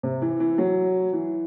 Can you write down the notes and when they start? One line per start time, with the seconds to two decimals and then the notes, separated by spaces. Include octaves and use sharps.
0.03 C3
0.22 E3
0.40 E3
0.58 F#3
1.13 E3